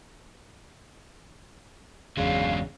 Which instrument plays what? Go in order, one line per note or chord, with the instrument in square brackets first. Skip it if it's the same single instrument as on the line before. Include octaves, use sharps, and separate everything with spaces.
[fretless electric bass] G1 E2 [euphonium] C#3 [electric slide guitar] F#3 G#3 D4 [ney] F5